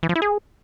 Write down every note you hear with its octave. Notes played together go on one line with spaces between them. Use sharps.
E3
F3
E4
G#4